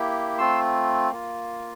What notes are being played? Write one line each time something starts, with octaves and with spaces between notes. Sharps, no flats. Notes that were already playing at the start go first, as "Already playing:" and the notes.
Already playing: A#3 E4 G4
A3 C4 F4 C6 E6
A#3 F4